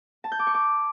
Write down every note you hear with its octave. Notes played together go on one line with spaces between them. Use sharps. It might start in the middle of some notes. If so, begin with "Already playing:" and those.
A5
G6
D6
C#6
D6